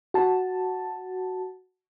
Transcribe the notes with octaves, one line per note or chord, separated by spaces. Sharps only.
F#4 A5